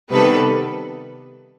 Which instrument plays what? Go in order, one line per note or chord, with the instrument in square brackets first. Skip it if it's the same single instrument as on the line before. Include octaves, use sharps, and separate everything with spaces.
[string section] C3 D#3 G3 B3 A4 B4